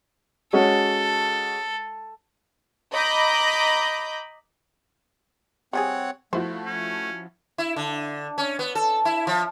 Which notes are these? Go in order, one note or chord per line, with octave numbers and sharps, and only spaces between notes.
G#3 C#4 F#4 A4
D#5 A#5 B5 D6 G6 A#6
G3 C4 G4 G#4 C#5 F#5
F3 A3 E4 F#4 C5
C#4
E4
D3
C#4
B3
A4
E4
F3